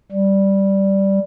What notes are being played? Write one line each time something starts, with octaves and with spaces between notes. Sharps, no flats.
G3